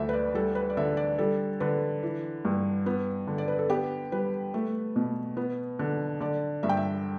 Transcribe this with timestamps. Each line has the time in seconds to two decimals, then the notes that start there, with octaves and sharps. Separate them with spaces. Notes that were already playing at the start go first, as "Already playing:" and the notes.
Already playing: D2 D3 E5
0.09 B4
0.13 D5
0.34 G3 A4
0.55 B4
0.70 D5
0.77 D3 E5
0.97 D5
1.18 G3 A4
1.60 D3 B4
2.03 E3
2.45 G2
2.86 B3
3.27 D3
3.38 D5
3.48 B4
3.59 A4
3.70 B3 G4
4.12 G3 B4
4.54 A3
4.96 B2
5.37 B3
5.79 D3
6.20 D3 D5
6.63 G2 E5
6.69 G5
6.77 E5